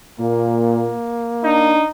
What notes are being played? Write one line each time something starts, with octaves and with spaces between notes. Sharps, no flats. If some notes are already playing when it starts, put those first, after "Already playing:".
A#2 A#3
D4 D#4